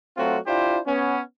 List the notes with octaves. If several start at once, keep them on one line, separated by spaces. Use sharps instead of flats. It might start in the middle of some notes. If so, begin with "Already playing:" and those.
F#3 A3 C4 F4 F#4
D4 E4 F4 G4 C5
B3 C#4